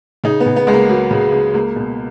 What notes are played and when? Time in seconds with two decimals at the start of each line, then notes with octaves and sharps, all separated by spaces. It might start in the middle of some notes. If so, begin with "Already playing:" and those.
0.24 C#3 D#4
0.40 B3
0.46 C#3
0.56 B3
0.67 C#2 G#3
0.73 A#3
0.89 F#3 A#3
1.11 C#3
1.32 C#2
1.54 C#2 A#3
1.76 B2